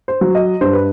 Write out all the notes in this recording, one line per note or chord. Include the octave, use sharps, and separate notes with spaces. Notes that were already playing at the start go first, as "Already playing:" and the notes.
C5
F#3
D#5
G2 C5
B4